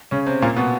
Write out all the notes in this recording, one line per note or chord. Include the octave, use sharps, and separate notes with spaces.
C#3 C#4
C3 C4
A#2 A#3
B2 B3